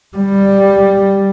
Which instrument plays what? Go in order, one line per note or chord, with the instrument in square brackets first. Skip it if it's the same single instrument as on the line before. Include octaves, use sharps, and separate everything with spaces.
[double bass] G3